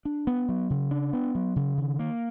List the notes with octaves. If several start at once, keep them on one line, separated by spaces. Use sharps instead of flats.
D4
B3
F#3
C#3
D4
B3
F#3
C#3
D#3
A#3